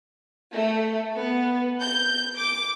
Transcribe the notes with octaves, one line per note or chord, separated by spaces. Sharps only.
A3
B3
G6
D6